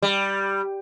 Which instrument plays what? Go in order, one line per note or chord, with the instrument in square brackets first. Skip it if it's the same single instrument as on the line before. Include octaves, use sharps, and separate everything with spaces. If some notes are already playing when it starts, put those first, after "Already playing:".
[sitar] G3